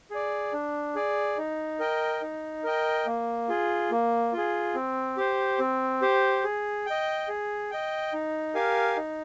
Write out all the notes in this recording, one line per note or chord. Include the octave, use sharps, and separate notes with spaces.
G#4 D5
D4
G#4 D5
D#4
A#4 D#5 G5
D#4
A#4 D#5 G5
A#3
F4 G#4
A#3
F4 G#4
C4
G4 C5
C4
G4 C5
G#4
D#5 G5
G#4
D#5 G5
D#4
G4 A#4 F5 G#5
D#4